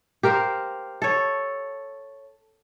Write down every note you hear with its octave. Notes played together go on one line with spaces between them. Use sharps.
G4 A#4 C5 F5
A4 C#5